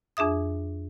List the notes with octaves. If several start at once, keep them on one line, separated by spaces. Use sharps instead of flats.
F2 D4 G#4 E5 D#6